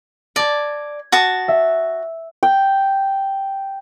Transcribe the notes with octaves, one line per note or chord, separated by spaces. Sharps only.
D5 A5 G#6 A#6
F#4 A5 D#6
E5
G5